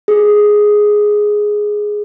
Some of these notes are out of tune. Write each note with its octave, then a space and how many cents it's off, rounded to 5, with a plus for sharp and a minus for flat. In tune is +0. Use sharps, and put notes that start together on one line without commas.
G#4 +5